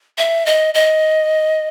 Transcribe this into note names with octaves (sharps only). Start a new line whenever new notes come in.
E5
D#5
D#5